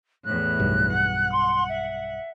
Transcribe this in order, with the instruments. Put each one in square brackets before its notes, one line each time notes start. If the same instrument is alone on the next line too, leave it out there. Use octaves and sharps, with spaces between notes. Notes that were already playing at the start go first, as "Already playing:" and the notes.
[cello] E2 A2 [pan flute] F#6
[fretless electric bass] B1 G2
[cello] F#5
[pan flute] C6
E5